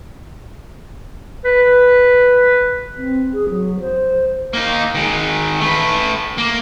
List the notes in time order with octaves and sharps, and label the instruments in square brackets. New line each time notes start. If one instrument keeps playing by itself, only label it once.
[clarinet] B4
[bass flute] C4
G#4
F#3
C5
[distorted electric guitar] A#3 D#4
D#3 G#3
A3 B4
A#3